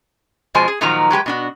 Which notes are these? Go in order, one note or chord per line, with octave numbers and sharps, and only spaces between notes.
B2 F3 G#3 C5 G#5
G#4
A#2 D#3 F3 F#3 D#4 A#5
F#3 G#3 G4 B4
B2 D4 F#4